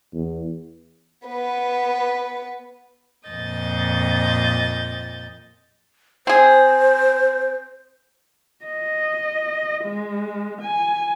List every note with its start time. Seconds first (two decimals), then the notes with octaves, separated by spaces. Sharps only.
0.14 E2
1.27 B3 B4
3.28 F2 A#2 D#5 G6 A6
6.27 C4 G#4 C5
8.65 D#5
9.85 G#3
10.62 G#5